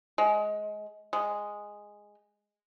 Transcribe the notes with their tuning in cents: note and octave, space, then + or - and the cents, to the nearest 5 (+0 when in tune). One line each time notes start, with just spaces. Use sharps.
G#3 +20
G#3 -5